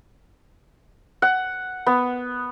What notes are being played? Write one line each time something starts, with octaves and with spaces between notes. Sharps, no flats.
F#5
B3